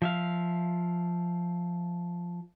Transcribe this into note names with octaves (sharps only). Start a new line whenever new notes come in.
F3 E5 F5